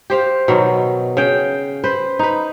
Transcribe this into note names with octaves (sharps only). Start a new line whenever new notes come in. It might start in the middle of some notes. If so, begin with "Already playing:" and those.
G4 C5 F5
B2 D#3 F#3
C#3 F5 G5
B4 C5
D#4 B4